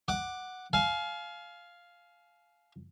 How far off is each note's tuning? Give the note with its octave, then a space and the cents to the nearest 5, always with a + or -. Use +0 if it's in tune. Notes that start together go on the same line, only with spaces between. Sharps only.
F#5 +0 D6 +10
F5 +0 G#5 +40